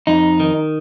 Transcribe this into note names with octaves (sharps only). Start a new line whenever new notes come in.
F2 D#4
D#3